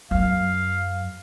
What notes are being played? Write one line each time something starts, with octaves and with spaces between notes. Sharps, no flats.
F#2 F5